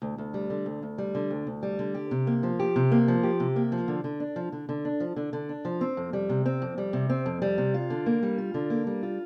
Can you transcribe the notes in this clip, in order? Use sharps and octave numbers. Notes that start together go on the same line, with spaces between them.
D2
D2
G3
D3
D2
D2
G3
D3
D2
D2
G3
D3
G4
C3
A#3
F3
G4
C3
A#3
F3
G4
C3
A#3
F3
D3
D3
D4
F3
D3
D3
D4
F3
D3
D3
D4
F3
C4
F2
G3
C3
C4
F2
G3
C3
C4
F2
G3
C3
F4
D3
A#3
G3
F4
D3
A#3
G3
F4